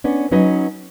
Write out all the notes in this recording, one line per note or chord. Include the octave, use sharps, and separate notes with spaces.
B3 C#4 D4
F#3 C#4 D#4 B4 D#5